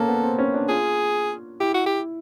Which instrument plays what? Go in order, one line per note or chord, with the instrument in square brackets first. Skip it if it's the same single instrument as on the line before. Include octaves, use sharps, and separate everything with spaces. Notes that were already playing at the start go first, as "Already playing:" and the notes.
Already playing: [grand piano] A#3 C#4 [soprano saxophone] A4
[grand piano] B3
C4
C#4
D4
[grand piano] F4 [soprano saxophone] G#4
[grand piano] E4 [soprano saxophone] G4
[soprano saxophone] F#4
G4